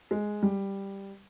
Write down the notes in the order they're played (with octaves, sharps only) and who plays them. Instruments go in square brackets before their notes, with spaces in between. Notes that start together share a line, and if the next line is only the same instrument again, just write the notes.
[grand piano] G#3
G3